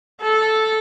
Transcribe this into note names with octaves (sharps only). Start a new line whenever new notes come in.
A4